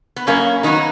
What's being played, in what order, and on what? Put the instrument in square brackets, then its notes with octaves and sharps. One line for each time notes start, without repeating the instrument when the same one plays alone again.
[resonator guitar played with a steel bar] B3
F#2 A#3 C#4
D#3 F#3 B3 D#4